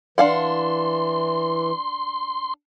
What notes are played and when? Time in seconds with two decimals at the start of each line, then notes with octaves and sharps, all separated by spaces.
0.18 E3 D4 F5 F#5 C6